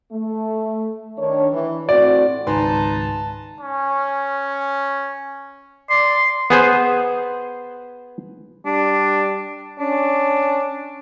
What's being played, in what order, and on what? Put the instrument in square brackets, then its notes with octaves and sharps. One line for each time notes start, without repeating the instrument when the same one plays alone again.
[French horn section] A3
D#3 D4 C#5
E3
[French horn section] A2 C4 F#4 [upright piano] D5
[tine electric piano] G#1 C#2 G#2 [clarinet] D#4 [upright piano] B4 G#5 C6 [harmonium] A5
[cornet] C#4
[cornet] D5 [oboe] C6
[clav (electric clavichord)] B3 G#4 C5
[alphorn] G3 [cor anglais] D4
[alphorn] C#4 [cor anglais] D4